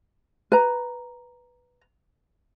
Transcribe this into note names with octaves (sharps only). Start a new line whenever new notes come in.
B4 A#5